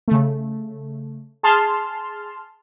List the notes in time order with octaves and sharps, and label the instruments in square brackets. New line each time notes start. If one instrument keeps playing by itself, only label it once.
[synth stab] C#3 A3
G#4 A5 C6 F6